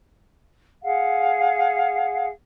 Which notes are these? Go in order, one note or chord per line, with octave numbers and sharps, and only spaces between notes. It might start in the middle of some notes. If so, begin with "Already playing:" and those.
G#4 F5 F#5